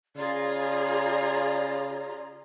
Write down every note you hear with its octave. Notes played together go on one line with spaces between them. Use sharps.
C#3 F4 G#4 D5 A#5